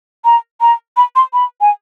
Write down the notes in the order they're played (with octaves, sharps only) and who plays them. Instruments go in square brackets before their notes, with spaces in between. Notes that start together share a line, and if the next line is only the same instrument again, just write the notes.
[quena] A#5
A#5
B5
C6
B5
G#5